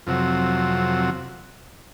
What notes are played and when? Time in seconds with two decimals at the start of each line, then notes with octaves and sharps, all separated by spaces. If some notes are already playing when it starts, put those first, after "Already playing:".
0.07 F2 C3 F#3